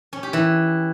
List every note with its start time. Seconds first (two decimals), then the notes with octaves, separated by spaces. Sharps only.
0.13 C#4
0.23 G4
0.33 E3